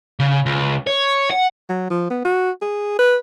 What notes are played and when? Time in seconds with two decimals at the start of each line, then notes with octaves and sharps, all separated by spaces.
0.20 C#3
0.46 C#2
0.87 C#5
1.30 F#5
1.69 F#3
1.90 F3
2.10 B3
2.25 F#4
2.62 G#4
2.99 B4